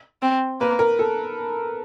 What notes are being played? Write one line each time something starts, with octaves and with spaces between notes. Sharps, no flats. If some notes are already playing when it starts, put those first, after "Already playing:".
C4
A#3 B4
A#4
A4